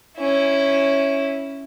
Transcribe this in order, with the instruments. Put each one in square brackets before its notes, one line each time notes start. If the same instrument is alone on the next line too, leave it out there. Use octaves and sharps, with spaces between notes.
[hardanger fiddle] C#4 E4